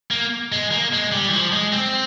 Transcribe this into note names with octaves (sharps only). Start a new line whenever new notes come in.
A#3
G#3
A#3
G#3
G3
E3
F3
G#3
C4